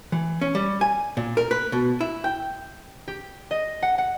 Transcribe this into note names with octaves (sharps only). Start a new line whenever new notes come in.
E3
C#4
G3
G#5
A#2
A#4
B4
B2
E4
G5
G4
D#5
F#5
F#5